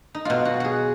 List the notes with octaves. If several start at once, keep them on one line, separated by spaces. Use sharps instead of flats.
D#4
B2 F#3 F4
F#4
F#4 G#4